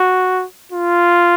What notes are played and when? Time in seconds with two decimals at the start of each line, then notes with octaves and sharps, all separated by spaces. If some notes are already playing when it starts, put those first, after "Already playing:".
Already playing: F#4
0.72 F4